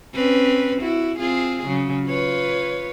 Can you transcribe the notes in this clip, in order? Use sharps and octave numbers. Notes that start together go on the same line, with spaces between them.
C4 C#4 B4
E4 F#4
C4 F4 G#4
C#3 F#3
F4 B4 C#5